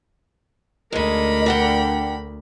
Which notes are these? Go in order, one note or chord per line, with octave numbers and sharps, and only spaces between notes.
D2 G#3 D#4 A#4 B5
D4 F#5 G5